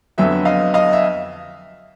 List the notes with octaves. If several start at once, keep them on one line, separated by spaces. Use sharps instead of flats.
F2 D3 F#3 B3 E5
D#5 F5
D#5 F5
E5